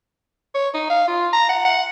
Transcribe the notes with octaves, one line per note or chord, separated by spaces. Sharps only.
C#5
D#4
F5
F4
A#5
F#5
F#5